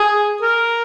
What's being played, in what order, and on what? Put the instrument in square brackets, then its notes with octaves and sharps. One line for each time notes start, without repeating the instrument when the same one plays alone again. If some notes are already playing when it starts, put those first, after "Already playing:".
Already playing: [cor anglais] G#4
A#4